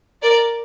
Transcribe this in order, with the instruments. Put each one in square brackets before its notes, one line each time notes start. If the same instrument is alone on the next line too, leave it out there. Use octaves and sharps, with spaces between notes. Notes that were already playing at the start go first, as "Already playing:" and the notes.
[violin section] A#4 D5